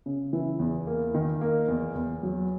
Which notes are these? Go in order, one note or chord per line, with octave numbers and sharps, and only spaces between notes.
C#3
E3
E2
A#3
D#3
A#3
E2
E2
F#3